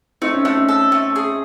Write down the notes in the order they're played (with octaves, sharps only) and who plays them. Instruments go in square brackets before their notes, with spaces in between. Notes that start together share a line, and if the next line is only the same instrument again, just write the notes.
[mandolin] A3 [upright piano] C4 D#4
[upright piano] C#4
[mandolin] A3 [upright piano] C4
[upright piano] C#4
[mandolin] A4
A3
G#4